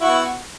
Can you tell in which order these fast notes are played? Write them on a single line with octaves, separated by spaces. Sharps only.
E4 F#4 B3